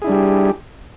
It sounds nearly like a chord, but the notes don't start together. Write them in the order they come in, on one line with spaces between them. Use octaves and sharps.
G#4 E4 D4 G3 G4